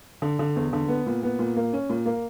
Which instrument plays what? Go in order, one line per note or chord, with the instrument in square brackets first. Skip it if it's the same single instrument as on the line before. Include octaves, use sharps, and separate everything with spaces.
[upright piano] D3
D3
E2
D3
B3
A#2
B3
A#2
A#3
C#4
A#2
A#3